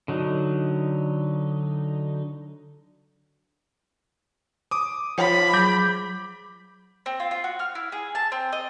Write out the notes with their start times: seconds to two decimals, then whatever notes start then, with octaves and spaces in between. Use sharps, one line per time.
0.08 D3 F#3 D#4
4.71 D6 D#6
5.18 F3 C#5 B5
5.54 F#3 G#4 D6 G6
7.06 C4
7.20 F4
7.31 F4
7.44 F#4
7.59 F6
7.75 E4
7.92 G#4
8.15 A5
8.32 C4
8.52 D#5